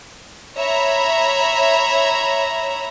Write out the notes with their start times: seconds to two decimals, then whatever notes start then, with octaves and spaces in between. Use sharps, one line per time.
0.57 C#5 E5 A#5 B5